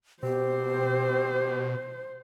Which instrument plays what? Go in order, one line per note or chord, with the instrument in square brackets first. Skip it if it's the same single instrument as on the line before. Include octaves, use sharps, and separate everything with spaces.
[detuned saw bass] B2 [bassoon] C4 [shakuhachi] G4 [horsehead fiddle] C5